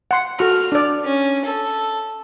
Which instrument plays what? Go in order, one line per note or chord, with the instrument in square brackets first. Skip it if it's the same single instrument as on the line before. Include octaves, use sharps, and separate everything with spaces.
[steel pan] F#5 C6
[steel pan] F#4 A4 [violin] F6
[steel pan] D4 D5
[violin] C#4
A4